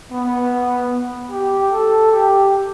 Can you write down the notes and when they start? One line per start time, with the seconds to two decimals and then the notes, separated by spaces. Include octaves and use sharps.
0.11 B3
1.31 G4
1.72 A4
2.11 G4